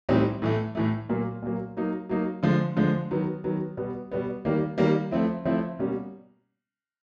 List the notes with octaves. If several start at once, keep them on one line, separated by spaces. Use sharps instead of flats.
A2 E3 G3 C4 D#4
A2 E3 A3
A2 E3 A3
A#2 F#3 A#3
A#2 F#3 A#3
F#3 A#3 D#4
F#3 A#3 D#4
D3 F3 G#3
D3 F3 G#3
D#3 F#3 B3
D#3 F#3 B3
B2 G3 B3
B2 G3 B3
D#3 G3 A#3
D#3 G3 A#3
F3 A3 C4 E4
F3 A3 C4 E4
B2 G3 A#3 C#4